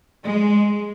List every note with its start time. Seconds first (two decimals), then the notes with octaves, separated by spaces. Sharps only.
0.23 G#3